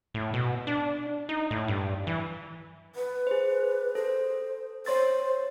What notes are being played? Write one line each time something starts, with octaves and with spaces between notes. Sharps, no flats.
A2
B2
D4
D#4
A2
G2
E3
B4
G#4 C5
A4 C5
C5 C#5 C6 A6